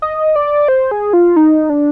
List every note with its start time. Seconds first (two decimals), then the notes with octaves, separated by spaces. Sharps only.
0.02 D#5
0.36 D5
0.68 C5
0.91 G#4
1.13 F4
1.36 D#4
1.70 D4